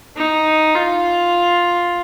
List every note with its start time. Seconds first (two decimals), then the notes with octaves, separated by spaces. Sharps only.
0.17 D#4
0.75 F4